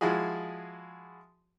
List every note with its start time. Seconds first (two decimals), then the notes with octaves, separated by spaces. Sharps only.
0.01 F3 G#3 E4 F#4 G#4